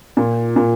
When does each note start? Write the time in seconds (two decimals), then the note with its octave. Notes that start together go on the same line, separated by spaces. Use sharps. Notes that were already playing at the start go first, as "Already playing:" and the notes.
0.17 A#2
0.56 A#2